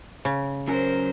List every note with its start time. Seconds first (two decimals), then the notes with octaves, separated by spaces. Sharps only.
0.25 C#3
0.68 F#3 C#4 A#4 C5 G#5